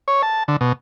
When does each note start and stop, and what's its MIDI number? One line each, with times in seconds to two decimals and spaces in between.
0.08 0.22 73
0.23 0.43 81
0.48 0.56 50
0.61 0.73 47